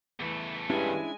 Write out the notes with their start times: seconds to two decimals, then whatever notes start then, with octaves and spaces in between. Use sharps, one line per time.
0.20 E2 E3 A3
0.70 G2 G#3 C#4 D4 E4 G#5